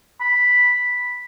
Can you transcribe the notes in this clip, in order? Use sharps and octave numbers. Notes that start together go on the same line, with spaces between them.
B5